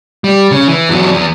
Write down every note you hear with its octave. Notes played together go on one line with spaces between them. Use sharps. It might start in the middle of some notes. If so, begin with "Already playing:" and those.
G3
C#3
E3
E2 F#3
E2